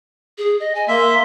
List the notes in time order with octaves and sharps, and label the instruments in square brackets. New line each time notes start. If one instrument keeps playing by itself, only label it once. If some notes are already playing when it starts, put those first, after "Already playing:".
[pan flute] G#4
D#5
G#5
[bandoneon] A#3 E5 [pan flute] C6